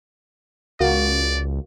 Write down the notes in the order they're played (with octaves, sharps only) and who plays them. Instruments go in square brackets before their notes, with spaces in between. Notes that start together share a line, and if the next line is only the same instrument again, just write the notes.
[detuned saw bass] C#2 [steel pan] F#4 A#4 F5 [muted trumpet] D5